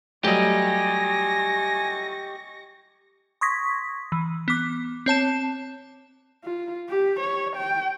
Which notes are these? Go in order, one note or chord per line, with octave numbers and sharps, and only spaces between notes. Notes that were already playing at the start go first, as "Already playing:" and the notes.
F#3 G3 A3 G4 D#5 G#5 C#6 A#6
C6 C#6 D#6 G#6 A#6 B6
E3
B3 D6
C4 C#5 A5 E7
F4
G4
C#5
G5